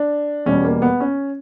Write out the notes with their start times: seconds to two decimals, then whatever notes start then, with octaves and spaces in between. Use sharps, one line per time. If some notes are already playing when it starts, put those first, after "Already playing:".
Already playing: D4
0.46 E2 B2 G3 C#4
0.65 A#3
0.82 B3
1.00 C#4